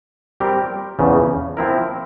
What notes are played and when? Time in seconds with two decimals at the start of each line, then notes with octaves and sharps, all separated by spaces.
0.40 G3 C4 G4 A#4
0.99 E2 C#3 F3
1.57 F3 C4 E4 A#4